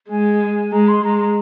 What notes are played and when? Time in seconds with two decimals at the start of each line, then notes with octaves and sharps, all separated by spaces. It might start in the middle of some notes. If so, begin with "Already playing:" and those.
0.09 G#3 G#5
0.72 G#3 A#5
0.87 C6
1.03 G#3 A#5
1.19 A#5